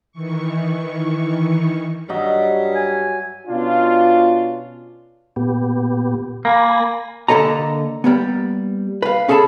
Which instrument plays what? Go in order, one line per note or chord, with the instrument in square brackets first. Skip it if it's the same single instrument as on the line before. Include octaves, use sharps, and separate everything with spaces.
[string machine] D#3 E3 C#6
[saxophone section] G2 G3 [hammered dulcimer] F#3 D#5 E5
[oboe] G#5
[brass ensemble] B2 C#4 D4 F4
[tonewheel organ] A#2 B3 G4
[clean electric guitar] A#3 [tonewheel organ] G#5 B5 A#6
[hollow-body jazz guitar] D3 A#3 A4 D#5 A#5
G3 A#3 B3
B4 F5
C#4 G#4 A4 D5 A5 B5